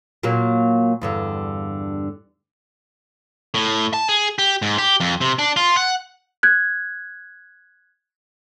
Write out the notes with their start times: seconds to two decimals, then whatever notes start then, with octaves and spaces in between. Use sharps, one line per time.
0.23 A#2 F#3 A#3
1.01 E2 G2 D3
3.54 A2
3.94 A5
4.09 G#4
4.39 G4
4.62 G#2
4.78 G4
5.00 F2
5.21 C3
5.39 D4
5.57 F4
5.77 F#5
6.43 F#6 G#6